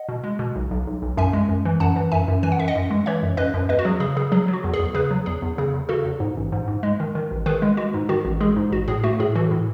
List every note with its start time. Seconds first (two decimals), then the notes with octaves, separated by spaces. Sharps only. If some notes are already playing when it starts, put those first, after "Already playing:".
Already playing: D#5 F#5
0.09 B2
0.24 G#3
0.39 B2
0.56 B1
0.71 B1
0.87 B1
1.02 B1
1.17 F#2 E5 G#5
1.33 G#3
1.49 F#2
1.65 E3
1.80 F#2 F#5 A5
1.96 E3
2.12 F#2 E5 G#5
2.28 F#2
2.43 E3 G#5
2.52 F#5
2.59 F#2 E5
2.68 D#5 F#5
2.76 F#2
2.91 G#3
3.06 E3 C#5 E5
3.23 F#2
3.37 F#2 B4 D#5
3.54 F#2
3.69 E2 B4 D#5
3.79 F#4
3.85 F#3 G#4
4.00 C#3 G#4
4.17 C#3 G#4
4.32 F#3 G#4
4.48 F#3
4.53 F#4
4.64 E2
4.74 G#4
4.79 E2
4.95 C#3 G#4 B4
5.11 F#3
5.26 E2 G#4
5.42 E2
5.58 C#3 G#4
5.74 E2
5.89 C#3 F#4 A4
6.05 E2
6.20 G#2
6.37 A1
6.52 G#2
6.68 G#2
6.83 G#3
7.00 D#3
7.15 D#3
7.31 A1
7.46 D#3 G#4 B4
7.62 G#3
7.77 G#3 F#4
7.94 G#2
8.09 D#3 F#4
8.25 A1
8.41 G#3 G#4
8.56 G#2
8.72 A1 F#4
8.88 A2 G#4
9.03 A3 F#4
9.19 A2 G#4
9.35 E3 F#4 A4
9.51 A2